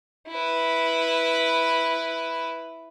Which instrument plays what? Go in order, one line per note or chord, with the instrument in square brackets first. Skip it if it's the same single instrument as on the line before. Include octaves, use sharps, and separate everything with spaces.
[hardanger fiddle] E4 B4